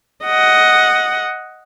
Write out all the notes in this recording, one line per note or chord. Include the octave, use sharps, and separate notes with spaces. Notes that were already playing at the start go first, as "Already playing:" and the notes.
D#5 F#5